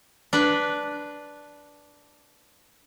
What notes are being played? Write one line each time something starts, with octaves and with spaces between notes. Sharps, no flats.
D4 B4